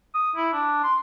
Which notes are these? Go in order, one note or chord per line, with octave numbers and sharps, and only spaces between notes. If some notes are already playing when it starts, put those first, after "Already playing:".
D#6
E4
D4
C6